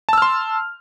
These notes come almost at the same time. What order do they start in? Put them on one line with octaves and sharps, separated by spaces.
A5 E6 F6 C6